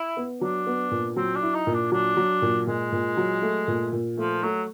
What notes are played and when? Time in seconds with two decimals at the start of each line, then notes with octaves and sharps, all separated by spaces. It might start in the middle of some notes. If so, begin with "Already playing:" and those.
Already playing: E4
0.17 B3
0.41 F#3 D4
0.67 B3
0.91 A#2
1.16 F#3 C4
1.36 D4
1.42 E4
1.54 D#4
1.67 A#2
1.73 D4
1.92 F#3 D4
2.17 F#3
2.42 A#2
2.67 A#2 G#3
2.92 A#2
3.17 F#3
3.42 A3
3.68 A#2
3.93 A#2
4.17 F3 A3
4.43 F#3 A3